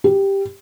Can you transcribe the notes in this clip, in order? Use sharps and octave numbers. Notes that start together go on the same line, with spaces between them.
G4